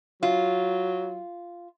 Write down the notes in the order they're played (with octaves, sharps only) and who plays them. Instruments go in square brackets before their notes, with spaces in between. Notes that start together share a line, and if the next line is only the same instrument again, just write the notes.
[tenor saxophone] F#3 [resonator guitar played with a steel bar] F4